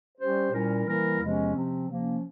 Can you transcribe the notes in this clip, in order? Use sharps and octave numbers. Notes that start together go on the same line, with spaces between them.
G3 C#4 G4 C5
A#2 G3 C#4 E4 A#4
E3 G3 A#3 E4 A#4
E2 C3 F3 G#3 C#4
C3 F3 C4
C3 F3 A#3 C#4